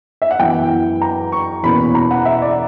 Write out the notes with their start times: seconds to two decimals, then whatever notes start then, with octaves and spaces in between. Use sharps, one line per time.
0.22 E5
0.31 F#5
0.39 F#2 E3 B3 G5
1.02 A#5
1.32 C#6
1.63 E2 B2 A#3 C#4 B5
1.95 A#5
2.11 F#5
2.25 E5
2.42 D5